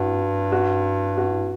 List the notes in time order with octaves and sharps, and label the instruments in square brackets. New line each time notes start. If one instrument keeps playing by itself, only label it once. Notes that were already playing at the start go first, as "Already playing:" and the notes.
Already playing: [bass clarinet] G2 [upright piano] F#4
[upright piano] F#4
F#4